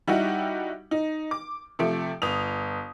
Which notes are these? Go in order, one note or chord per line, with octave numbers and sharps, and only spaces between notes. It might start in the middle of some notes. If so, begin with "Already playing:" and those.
G3 D#4 E4 F#4 G4
D#4
D6
C3 F3 A3 D7
G1 D#6 F7